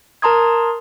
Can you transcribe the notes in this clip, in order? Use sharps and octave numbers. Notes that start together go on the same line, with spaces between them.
A#4 A5 A#5 C6 D#6 G#6